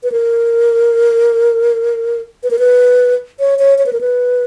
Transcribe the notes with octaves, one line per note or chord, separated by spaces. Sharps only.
B4
A#4
B4
A#4
B4
C#5
C#5
C#5
B4
A#4
B4